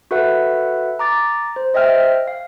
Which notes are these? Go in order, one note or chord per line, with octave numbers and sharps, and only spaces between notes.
F#4 A4 B4 E5 F#5
A#5 D6 A6
C5
C5 D#5 E5 G5 F6
F5